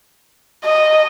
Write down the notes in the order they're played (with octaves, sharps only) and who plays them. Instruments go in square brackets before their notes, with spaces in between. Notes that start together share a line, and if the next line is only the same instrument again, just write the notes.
[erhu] D#5